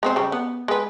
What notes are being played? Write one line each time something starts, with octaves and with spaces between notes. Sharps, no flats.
G#3 C4 C5
C#3 G3
B3
G#3 B4